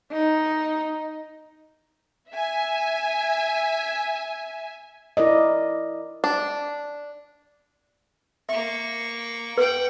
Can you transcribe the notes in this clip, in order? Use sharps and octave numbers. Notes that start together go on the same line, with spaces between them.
D#4
E5 G#5
E4 A#4 D5 D#5
D4
A#3 E5 C#6
B4 F#5 G5